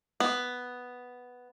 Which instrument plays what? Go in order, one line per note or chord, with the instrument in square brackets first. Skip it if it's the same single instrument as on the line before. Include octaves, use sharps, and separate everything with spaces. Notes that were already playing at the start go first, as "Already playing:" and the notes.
[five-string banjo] B3